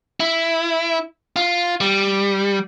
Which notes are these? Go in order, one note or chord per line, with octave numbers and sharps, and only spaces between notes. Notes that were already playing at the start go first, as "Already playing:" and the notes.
E4
F4
G3